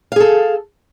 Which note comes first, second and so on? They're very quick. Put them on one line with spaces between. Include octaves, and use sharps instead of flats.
F5 G#4 A4